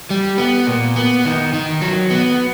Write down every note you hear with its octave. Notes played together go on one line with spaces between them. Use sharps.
G3
B3
A#2
B3
D#3
D#3
F#3
B3